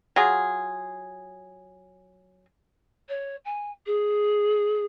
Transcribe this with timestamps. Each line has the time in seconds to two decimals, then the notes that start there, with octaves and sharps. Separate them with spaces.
0.16 F#3 F4 G#4
3.09 C#5
3.45 G#5
3.86 G#4